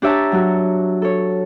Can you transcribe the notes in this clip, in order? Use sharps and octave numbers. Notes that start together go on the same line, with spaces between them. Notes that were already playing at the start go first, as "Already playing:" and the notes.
D4 G4 C#5 E5 A5 A#5
F#3 F#4
A4 C#5